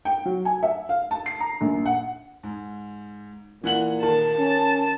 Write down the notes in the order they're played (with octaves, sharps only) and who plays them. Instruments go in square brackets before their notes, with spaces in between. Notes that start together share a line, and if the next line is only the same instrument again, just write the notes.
[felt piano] G5
F#3
G#5
E5
F5
A5
C7
A#5
A#1
F#5
[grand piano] G#2
[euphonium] A#2 [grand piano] E3 F#5 F#7
[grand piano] D#3 [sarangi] A5
[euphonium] C#4